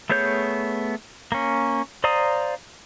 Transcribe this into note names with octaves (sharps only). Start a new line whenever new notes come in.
A3 B3 G#4 C#5 G6
A#3 C#4
C5 D5 F5 A#5 D#6